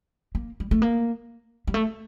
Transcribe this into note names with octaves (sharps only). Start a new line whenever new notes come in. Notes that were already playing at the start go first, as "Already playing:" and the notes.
A#3
G3
A3
A#3
G3
A3